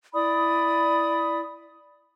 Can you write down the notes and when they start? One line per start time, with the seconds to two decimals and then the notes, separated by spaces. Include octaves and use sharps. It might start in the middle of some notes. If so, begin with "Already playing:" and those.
0.13 E4 D5 B5 D#6